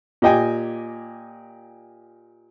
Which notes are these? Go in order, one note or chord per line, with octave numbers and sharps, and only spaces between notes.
A#2 G4 D#5 G5 G#5